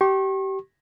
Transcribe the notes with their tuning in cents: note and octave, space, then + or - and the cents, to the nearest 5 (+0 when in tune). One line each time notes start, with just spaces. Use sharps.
G4 -25 C#6 -40